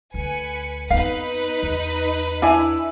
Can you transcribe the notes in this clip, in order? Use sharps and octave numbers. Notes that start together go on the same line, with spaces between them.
D2 B4 G#5 C#7
F2 B3 D#4 B4 F5
E2
D4 E4 C#5 G#5